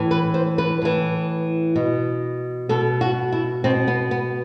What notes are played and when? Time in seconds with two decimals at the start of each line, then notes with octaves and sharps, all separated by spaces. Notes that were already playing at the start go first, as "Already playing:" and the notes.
Already playing: A2 E3
0.11 B4
0.34 C5
0.58 B4
0.82 A2 E3
1.76 B2
2.69 B2 A4
3.01 F#4
3.32 E4
3.64 B2 C4
3.87 B3
4.11 B3